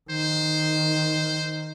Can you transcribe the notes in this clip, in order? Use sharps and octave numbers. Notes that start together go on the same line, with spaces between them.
D#3 C5